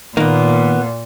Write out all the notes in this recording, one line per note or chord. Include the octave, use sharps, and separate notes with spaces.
A#2 D#3 A#3 B3